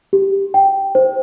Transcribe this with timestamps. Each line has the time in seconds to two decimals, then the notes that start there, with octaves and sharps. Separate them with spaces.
0.13 G4
0.54 G5
0.95 C5